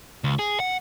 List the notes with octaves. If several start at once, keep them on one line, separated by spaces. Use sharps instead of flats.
C#2
G#4
F#5